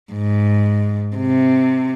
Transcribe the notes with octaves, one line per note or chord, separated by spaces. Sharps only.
G#2
C3